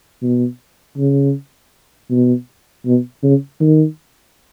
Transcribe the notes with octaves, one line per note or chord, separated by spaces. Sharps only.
B2
C#3
B2
B2
C#3
D#3